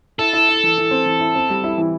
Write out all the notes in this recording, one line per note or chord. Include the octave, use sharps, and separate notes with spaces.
E4 A4
E4
E4
E3
E3
C4
E3
E4
C4
G3
E4
E3